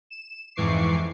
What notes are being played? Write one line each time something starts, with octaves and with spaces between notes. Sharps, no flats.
E7
F2 G#2 E3 C#6 D6 C7